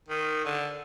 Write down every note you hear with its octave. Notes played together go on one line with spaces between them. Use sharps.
D#3
D3